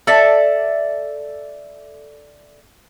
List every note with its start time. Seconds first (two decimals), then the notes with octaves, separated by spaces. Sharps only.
0.07 A4 D5 E5